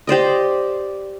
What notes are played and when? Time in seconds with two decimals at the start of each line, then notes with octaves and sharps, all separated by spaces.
0.07 G4 C5 D5 D#5